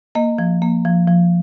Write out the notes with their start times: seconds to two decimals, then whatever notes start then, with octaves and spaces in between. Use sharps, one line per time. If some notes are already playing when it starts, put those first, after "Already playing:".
0.15 A#3 D#5
0.38 F3
0.62 A#3
0.85 F3
1.08 F3